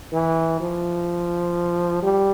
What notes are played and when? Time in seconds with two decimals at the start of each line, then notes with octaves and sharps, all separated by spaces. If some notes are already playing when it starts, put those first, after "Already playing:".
0.12 E3
0.60 F3
2.03 G3